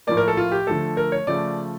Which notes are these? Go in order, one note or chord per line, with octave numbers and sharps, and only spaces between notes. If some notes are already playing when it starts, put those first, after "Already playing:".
A2 F3 A#3 D5
A#4
A4
F4
G4
D3 F3 A3 A4
A#4
C#5
C#3 F3 A3 D5